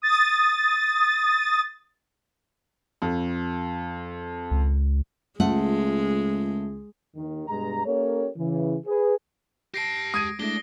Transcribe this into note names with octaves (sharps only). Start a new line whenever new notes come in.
D#6 A6
F2
C#2
C#2 G#3 A3 F4 F#5
D#2 D#3
G2 B2 G#3 A#5
A#3 C#4 G4 A4 A#4 C#5
C#3 E3
G#4 B4
G4 A5 A#6 C7 D7
G#3 D#6 G#6 D#7
G#3 A3 D4 E4 A#6 G7